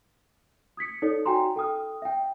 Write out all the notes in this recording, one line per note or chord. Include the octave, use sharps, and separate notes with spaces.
D#6 G#6 B6 C#7
D#4 A4 C#5 D5
D#4 F#4 G5 G#5 A#5 C6
A4 G5 D#6 F6
E5 G5